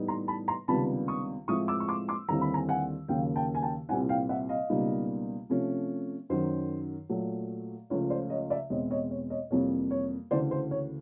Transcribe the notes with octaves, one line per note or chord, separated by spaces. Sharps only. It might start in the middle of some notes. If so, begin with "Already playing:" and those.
Already playing: A2 E3 G3 B3 D#4
A#5 C6
A5 B5
A#5 C6
C#2 C3 D#3 G3 B3 A5 B5
C#6 D#6
A2 F3 G#3 C4 E4 C#6 D#6
D6 E6
C#6
C6 D6
C6 D6
D#2 D3 G3 C4 E4 A#5
B5
G#5 A#5
F#5 G#5
D#2 C#3 F#3 A#3 C#4 F5 G5
G5 A5
G#5
G5 A5
C2 A#2 G3 C4 E4 F#5 G#5
F5 G5
E5 F#5
D#5 F5
C#2 B2 G3 A#3 D#4
C3 F3 A3 C#4
F#2 D#3 F#3 C5
A#2 F#3 A3
C#2 C#3 F3 A3 C#4 C#5
C5 D5
C#5 D#5
D5 E5
E2 B2 G#3 C4 E4 C#5 D#5
C#5 D#5
C#5
C#5 D#5
F2 C3 E3 G3 A#3 C#5
C#5
D2 C#3 E3 C5 D5
C5
C#5